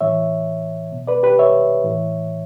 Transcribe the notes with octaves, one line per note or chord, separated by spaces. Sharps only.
A2 E3 C#5 E5
B2
B4 D5
G4 B4
C#5 E5
A2 E3